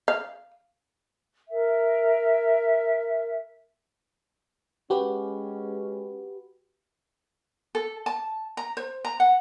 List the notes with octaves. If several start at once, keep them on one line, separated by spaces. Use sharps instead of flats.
F5
A#4 E5
G#3 C#4 F#4 G4 B4
A4
A5
A#5
C5
A#5
F#5